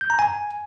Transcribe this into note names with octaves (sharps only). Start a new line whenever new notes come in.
G6
A#5
G#5